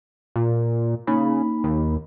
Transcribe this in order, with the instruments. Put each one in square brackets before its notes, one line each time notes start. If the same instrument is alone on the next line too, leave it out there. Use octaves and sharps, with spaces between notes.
[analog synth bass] A#2
[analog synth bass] C#3 [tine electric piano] A#3 D#4 B5
[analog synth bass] D#2